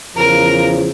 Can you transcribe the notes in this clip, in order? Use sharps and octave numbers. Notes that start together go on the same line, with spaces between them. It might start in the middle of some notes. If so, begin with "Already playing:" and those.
E2 C#3 F3 A#4